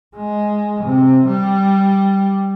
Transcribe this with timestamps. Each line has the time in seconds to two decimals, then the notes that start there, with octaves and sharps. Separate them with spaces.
0.16 G#3
0.84 C3
1.27 G3